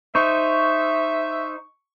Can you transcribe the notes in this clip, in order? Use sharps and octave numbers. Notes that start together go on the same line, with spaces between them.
D#4 C5 E5 C#6